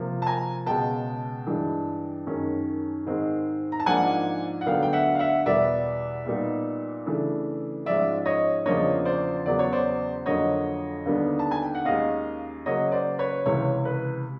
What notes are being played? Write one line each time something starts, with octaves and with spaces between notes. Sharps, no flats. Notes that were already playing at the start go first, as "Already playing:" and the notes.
Already playing: C3 F3 A#3
A5
G#5 A#5
C#2 B2 G#3 B3 G5 A5
G2 E3 G#3
F#2 D#3 G#3 C#4
G#2 D#3 G#3 C4
A#5
A5
G#2 F3 A#3 D4 F#5 G#5
F#5
D2 D3 F#3 B3 D4 F5 G5
G5
E5 F#5
F5
E5 F#5
E2 B2 G3 B3 D5 E5
A#2 G3 B3 D#4
C#3 E3 A3 D4
G#2 F3 G#3 C#4 D5 E5
C#5 D#5
E2 C#3 F3 A#3 D4 C#5 D#5
C5 D5
E2 C#3 F#3 B3 D5
C#5
C5 D5
F2 D3 F#3 A#3 C#5 D#5
D#2 D3 G3 B3 D4
A5
G#5
G5
F#5
D#2 D#3 G#3 C#4 D#5 F5
C#3 F#3 A#3 C#5 D#5
C5 D5
B4 C#5
C#2 C3 E3 B4 C#5
B4